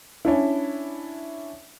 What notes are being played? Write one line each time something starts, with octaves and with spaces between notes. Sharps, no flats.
C#4 D4 E4